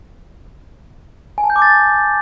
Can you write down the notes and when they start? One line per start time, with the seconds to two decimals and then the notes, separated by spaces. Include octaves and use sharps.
1.38 G#5
1.44 A5
1.50 G6
1.56 D6
1.62 A6